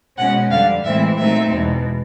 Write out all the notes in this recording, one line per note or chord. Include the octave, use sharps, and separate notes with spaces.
B2 G#3 C#4 F#5
F2 D3 G3 F5
A2 E3 G#3 C4 E5
A#2 F#3 A3 C4 D#4 E5
E2 B2 G#3